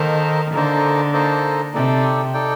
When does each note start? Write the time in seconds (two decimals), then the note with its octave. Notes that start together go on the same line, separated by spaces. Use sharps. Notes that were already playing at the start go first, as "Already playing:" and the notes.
Already playing: D#3 A#3 D#4 A4 C5 D#5
0.53 D3 A#3 D#4 A4 C5 D#5
1.13 A#3 D#4 A4 C5 D#5
1.74 C3 D#4 A4 D5 G5
2.34 D#4 A4 D5 G5